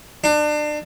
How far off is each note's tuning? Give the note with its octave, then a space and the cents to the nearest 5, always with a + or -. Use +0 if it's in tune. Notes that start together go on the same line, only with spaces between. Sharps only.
D4 +30